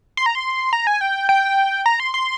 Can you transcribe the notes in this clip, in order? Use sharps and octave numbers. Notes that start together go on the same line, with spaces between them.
C6
A#5
C6
A#5
G#5
G5
G5
A#5
C6
C6